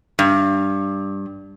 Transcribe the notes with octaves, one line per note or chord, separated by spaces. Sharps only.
G2